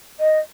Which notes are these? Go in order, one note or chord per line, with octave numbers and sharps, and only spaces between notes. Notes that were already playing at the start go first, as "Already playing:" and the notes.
D#5